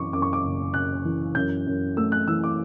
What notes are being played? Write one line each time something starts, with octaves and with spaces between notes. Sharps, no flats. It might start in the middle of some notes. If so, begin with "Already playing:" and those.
Already playing: F#2 E3 C#6 D6
F#2 D6
C#6
D6
F#1
F#2 F#6
E3
F#2 G6
F#2
A3 E6
F#6
E3 E6
D6